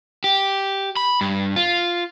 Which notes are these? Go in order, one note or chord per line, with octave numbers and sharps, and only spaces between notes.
G4
B5
G2
F4